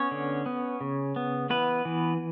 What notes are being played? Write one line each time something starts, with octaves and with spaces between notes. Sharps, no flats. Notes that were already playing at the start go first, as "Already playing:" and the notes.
Already playing: B3 C#4 C#5
D3
B3
C#3
B3
E3 B3 B4
E3